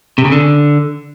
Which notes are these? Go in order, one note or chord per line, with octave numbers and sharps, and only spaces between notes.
C3
C#3
D3